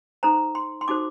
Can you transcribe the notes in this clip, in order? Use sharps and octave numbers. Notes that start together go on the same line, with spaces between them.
D#4 A4 C5 A#5
C6
C6
D#4 F#4 A4 C5 D6